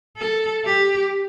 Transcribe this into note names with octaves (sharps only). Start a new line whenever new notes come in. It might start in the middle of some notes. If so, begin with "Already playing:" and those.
A4
G4